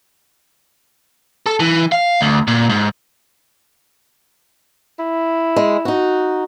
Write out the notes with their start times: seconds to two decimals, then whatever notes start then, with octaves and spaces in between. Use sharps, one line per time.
1.46 A4
1.60 E3
1.92 F5
2.21 D2
2.48 A#2
2.70 G#2
4.99 E4
5.56 G#3
5.85 D#4 F#4